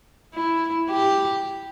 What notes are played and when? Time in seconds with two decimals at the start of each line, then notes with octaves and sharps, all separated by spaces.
0.35 E4
0.90 G4